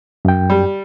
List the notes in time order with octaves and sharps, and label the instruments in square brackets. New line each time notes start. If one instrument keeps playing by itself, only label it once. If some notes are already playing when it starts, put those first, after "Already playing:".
[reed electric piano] F#2 G5
[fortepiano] G3